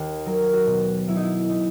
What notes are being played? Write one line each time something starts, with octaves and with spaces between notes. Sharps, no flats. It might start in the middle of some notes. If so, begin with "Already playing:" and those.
Already playing: D#2
F#3 A#4
F#4
B2
F#3 E4
D#4
E4
D#4